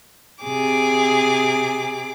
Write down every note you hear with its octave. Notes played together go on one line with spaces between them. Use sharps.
C3 G#4 D6